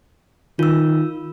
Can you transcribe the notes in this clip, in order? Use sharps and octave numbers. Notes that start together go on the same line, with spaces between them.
D#3 F4 E6